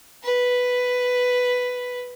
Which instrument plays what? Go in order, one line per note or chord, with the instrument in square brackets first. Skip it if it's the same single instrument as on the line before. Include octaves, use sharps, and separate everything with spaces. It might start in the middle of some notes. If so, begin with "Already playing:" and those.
[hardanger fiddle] B4